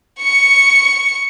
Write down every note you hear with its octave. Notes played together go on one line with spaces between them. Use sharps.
C#6 C#7